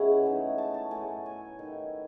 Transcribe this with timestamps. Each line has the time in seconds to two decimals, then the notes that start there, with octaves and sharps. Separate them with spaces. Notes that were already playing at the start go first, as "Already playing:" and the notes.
Already playing: C#3 G#3 B3 E4 C#5 E5 F#5
0.23 E3 A3 D#4
0.58 A5
0.74 A5
0.91 A2 F#3 A3 G#5
1.26 G#5
1.59 D#3 A3 E4